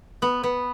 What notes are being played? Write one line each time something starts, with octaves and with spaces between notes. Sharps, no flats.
B3
B3